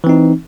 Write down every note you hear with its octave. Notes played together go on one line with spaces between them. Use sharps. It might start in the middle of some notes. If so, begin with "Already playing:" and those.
E3 C4 D#4